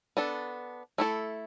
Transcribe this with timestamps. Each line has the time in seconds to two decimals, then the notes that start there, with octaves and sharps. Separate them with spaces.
0.17 B3 D4 A4
0.98 A3 E4 A4